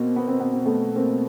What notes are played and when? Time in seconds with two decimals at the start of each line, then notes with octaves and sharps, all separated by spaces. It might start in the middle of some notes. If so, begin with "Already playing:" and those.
Already playing: B2 A#3 C4
0.16 B3
0.28 C4
0.40 B3
0.53 C4
0.66 A3 B3
0.96 A#3 C4